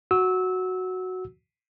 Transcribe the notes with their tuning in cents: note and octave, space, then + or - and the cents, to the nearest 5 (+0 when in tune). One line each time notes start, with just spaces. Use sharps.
F#4 +0 E6 -20